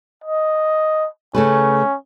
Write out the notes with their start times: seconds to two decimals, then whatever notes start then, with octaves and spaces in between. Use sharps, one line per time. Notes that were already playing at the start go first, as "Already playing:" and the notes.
0.24 D#5
1.35 C#3 A3 C#4 B4